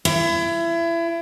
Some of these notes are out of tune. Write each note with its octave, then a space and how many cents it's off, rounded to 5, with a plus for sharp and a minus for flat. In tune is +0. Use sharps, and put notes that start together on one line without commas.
E4 +30